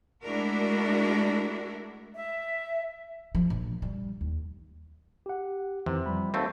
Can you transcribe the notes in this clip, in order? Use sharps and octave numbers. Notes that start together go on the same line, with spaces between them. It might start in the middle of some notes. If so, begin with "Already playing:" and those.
G#3 A3 D4 E4 F#4 A#4
E5
F3
A#1
G3
D#2
G4 F#5
F2 C3 D#3 E3
F3 G3 B5
D#2 A3 C4 A4